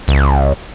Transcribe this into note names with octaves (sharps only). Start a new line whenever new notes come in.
C#2